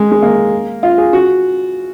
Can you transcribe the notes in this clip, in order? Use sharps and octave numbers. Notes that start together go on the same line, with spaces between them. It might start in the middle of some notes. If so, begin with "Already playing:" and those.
Already playing: G#3
G#3
A#3
F4
G#4
F#4